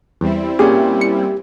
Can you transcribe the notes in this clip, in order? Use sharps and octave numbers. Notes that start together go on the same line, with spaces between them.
E2 G3 C4 E4
A#2 C#4 G4 G#4
C#7